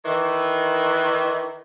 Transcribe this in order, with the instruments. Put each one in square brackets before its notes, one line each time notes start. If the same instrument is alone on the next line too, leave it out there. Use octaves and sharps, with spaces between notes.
[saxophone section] D#3 E3